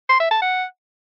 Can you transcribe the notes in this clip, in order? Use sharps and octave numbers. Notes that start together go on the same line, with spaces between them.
C6
E5
A5
F#5